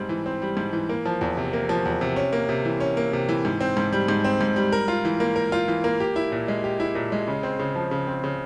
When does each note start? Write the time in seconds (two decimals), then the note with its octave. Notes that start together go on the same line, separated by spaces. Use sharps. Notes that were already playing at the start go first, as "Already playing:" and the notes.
Already playing: G#2 G3 C4
0.09 E3
0.26 C4
0.42 G3
0.57 G#2
0.73 E3
0.89 A#3
1.05 F3
1.21 E2
1.37 C3
1.53 A#3
1.69 F3
1.85 E2
2.01 C3
2.16 C#4
2.33 A#3
2.49 C3
2.65 E3
2.80 C#4
2.97 A#3
3.13 C3
3.29 E3
3.45 G#2
3.60 C4
3.77 G#2
3.93 G3
4.08 G#2
4.24 C4
4.41 G#2
4.56 G3
4.72 A#4
4.88 F4
5.05 E3
5.20 A#3
5.36 A#4
5.52 F4
5.68 E3
5.84 A#3
6.00 G4
6.16 E4
6.32 A#2
6.48 G#3
6.64 G4
6.80 E4
6.95 A#2
7.12 G#3
7.28 C#3
7.43 C4
7.59 C#3
7.75 F3
7.91 C#3
8.07 C4
8.24 C#3